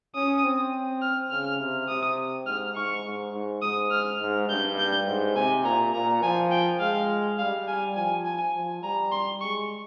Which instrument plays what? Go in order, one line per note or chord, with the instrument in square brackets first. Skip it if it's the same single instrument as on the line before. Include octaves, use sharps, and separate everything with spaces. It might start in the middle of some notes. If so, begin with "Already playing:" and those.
[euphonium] C#4 [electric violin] D#6
[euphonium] C4
[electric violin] F6
[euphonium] C#3 [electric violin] F6
[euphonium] C3
[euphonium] C3 [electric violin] D#6
[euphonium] G#2 [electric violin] F6
[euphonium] G#2 [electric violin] C#6
[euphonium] G#2
G#2
[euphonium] G#2 [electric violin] D#6
[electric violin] F6
[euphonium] G#2
[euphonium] G2 [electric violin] G6
[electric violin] G6
[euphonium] G#2
[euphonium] C3 [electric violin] G#5
[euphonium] A#2 [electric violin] A#5
[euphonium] A#2 [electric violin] A#5
[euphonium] F3 [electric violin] G#5
[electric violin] G5
[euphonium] G#3 [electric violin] F5
[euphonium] G3 [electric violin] F5
[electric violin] G#5
[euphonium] F3 [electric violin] G#5
[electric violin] G#5
[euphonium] F3
[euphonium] G3 [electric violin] A#5
[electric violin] C6
[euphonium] G#3 [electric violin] C#6